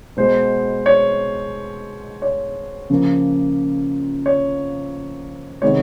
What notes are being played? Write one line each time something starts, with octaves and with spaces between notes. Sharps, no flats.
B2 G#3 B3 C5
C#5
C#5
C#3 F3 A#3
C#5
C3 D#3 G#3 B3 C#5